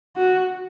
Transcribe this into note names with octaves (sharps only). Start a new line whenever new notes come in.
F#4